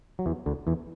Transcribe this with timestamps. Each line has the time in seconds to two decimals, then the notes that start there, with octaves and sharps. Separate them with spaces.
0.19 F#3
0.26 E2 E3
0.46 D2 D3
0.67 E2 E3